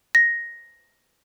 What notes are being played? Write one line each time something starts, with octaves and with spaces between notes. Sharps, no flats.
A#6